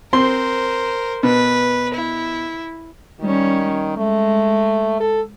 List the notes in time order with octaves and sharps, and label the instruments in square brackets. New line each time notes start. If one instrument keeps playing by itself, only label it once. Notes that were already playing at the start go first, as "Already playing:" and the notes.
[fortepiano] C4 C6 [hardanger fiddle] A#4 C5
[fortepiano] B2 [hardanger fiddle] B4
[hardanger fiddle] E4
[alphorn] D#3 [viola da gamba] G3 C#4
[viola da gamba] G#3 [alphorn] A3
[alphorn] A4